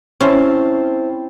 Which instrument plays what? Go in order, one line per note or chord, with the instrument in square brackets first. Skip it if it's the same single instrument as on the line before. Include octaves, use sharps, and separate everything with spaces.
[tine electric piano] C4 E4 A5 [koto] C#4 C5